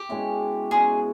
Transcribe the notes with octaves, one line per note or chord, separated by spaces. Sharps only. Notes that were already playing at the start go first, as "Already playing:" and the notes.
Already playing: G4
B2 G#3 C#4 E4
B2 G#3 C#4 F#4 G#4